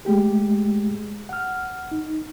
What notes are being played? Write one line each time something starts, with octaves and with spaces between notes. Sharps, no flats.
G#3 A3 G4 G#4
F#5 F6
D#4